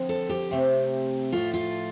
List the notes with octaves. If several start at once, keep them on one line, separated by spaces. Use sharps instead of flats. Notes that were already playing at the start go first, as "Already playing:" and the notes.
Already playing: D3 F3 C4
A4
G4
C3 A3 C4
A2 F3 A3 F4
F4